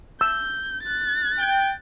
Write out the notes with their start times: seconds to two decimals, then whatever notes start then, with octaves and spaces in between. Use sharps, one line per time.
0.21 E6 G6
0.83 F#6 A6
1.38 G5